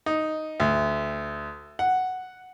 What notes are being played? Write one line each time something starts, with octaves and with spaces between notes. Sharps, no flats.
D#4
D2
F#5